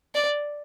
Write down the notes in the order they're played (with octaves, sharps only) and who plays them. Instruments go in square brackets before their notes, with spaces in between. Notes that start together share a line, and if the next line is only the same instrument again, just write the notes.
[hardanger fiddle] D5